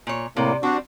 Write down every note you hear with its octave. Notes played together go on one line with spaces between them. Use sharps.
A#2 C#5
A2 C3 A#3 D5
G3 C4 D4 F#4